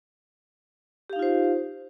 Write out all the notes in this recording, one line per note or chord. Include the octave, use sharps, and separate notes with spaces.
D#4 F4 G4 C5 F5